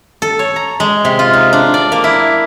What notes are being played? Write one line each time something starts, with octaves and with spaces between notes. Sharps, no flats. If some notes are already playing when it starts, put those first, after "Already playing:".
A4
C#5
A#5
G#3
C3
F4
D#4
D4
D5
A#3
E4